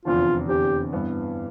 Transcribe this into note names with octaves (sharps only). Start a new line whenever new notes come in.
F1 E2 D3 F3 F4
F1 E2 D3 G4
G2 E3 B3